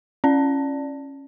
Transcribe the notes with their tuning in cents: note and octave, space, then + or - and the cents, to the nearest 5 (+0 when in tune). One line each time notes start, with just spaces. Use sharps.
C#4 -10 D5 +0